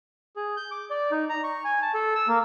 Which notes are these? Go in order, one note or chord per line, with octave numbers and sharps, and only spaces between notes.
G#4
G6
D6
D5
D#4
A#5
C#6
G#5
A5
A4
E6
A#3